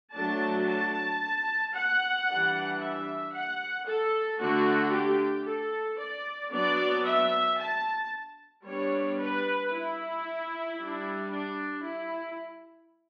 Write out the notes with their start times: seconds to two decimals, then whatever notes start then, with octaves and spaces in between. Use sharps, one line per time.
0.15 F#3 A3 D4 A5
0.68 A5
1.73 F#5
2.28 E3 G3 D4
2.81 E5
3.33 F#5
3.87 A4
4.40 D3 A3 D4 F#4
4.93 G4
5.46 A4
5.99 D5
6.52 F#3 B3 D4 D5
7.05 E5
7.59 A5
8.64 G3 B3 D4 C#5
9.18 B4
9.71 E4
10.78 G3 D4
11.30 D4
11.84 E4